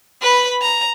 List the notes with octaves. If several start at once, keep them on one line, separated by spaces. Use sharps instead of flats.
B4 B5
A#5